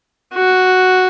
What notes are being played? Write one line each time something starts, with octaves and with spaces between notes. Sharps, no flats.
F#4